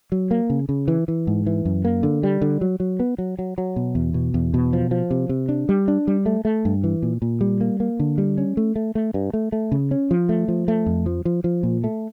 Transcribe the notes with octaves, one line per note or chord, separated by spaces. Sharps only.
F#3
A#3
C#3
C#3
E3
E3
G#2
E3
F#2
A#3
D3
G3
D3
F#3
F#3
B3
F#3
F#3
F#3
B2
E2
B2
E2
B2
F3
F3
C3
C3
D4
G3
D4
G3
A3
A3
G2
E3
A#2
A#2
G3
A#3
A#3
D3
G3
C#4
A3
A3
A3
G2
A3
A3
C#3
C#4
F3
A3
F3
A3
F2
F3
F3
F3
A#2
A3